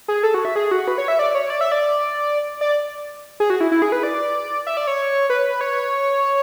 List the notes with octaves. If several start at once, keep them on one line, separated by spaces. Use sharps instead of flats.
G#4
A4
F#4
E5
G#4
F#4
B4
C#5
E5
D5
C#5
D5
E5
D5
D5
G#4
F#4
E4
E4
G#4
B4
D5
E5
D5
C#5
B4
C#5